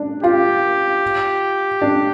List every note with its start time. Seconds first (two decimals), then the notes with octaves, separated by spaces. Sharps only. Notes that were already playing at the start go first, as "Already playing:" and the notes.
Already playing: D4
0.23 F4 G4
1.82 D4